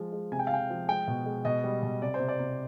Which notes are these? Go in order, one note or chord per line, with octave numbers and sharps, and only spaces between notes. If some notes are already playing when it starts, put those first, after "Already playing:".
Already playing: F3 G#3
G#3
C3 G#5
G5
F5
C3 G5
F3
G#3 G5
B2
G#3
B2 D#5
G3
B2
C3 D5
C5
C3
D5
C3